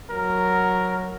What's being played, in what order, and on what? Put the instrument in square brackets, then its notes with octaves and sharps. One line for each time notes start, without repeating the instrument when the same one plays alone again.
[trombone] F#3 [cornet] A#4